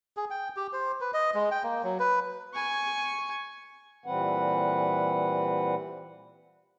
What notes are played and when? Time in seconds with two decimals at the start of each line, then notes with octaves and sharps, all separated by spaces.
0.17 G#4
0.30 G5
0.56 G4
0.73 C5
1.01 B4
1.14 D#5
1.34 G#3
1.51 G5
1.63 A#3
1.83 F#3
1.99 B4
2.54 G#5 C#6
4.06 A#2 E3 G3 C4 B4 F#5